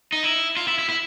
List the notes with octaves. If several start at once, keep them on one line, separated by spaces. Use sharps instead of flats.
D#4
E4
F4
E4
E4
E4